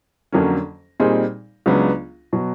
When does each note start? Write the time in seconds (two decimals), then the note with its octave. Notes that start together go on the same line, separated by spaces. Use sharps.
0.32 F2 D3 F#3 A#3 C#4
1.00 A#2 G3 C4 D#4 G#4
1.66 C#2 C#3 F#3 B3 D4
2.33 B2 F#3